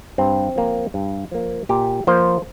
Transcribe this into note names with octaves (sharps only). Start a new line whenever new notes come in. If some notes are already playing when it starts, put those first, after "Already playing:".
G2 C4
F3 A#3
G2
F3 A#3
A#2 G4
F3 A#3 C5